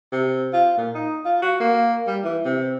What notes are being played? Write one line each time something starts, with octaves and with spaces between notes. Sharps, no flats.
C3
F4
A#2
D#4
F4
F#4
A#3
G3
E3
C3